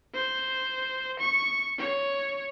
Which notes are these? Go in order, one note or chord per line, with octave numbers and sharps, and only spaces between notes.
C5
C#6
C#5